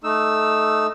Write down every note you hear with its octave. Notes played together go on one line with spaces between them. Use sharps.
A3 D#4 E6